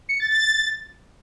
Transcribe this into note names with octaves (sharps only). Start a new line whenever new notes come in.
C#7
A6
A6